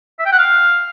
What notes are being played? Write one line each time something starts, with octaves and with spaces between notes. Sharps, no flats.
E5
G5
F#5
F5